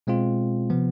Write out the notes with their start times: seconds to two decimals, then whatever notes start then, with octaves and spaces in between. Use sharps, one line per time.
0.07 B2 G#3 C4 F4
0.70 C3 F3 B3